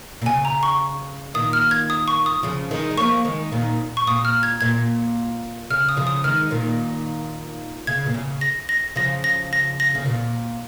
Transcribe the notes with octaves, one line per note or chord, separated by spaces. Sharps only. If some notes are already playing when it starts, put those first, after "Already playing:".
A#2
C#3 G#5
A#5
C#6
A#2 D#3 D#6
F6
G#6
D#6
C#6
D#6
C#3 F3
D#3 G#3
G#3
F3 A#3 C#6
D#3 G#3
A#2 D#3
C#6
A#2 D#6
F6
G#6
A#2 G#6
C#3 F6
D#6
C#3 F3
D#6
D#3 G#3 F6
A#2 D#3
C#3 G#6
A#2
C#3
A#6
A#6
C#3 F3 A#6
A#6
A#6
A#6
C#3
A#2